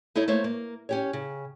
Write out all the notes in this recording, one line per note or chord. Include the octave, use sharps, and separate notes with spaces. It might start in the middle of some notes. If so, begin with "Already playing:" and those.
D#4 E4 A4 C#5
A3 A#3 C5 C#5
A#3
C#4 G4 C#5
C#3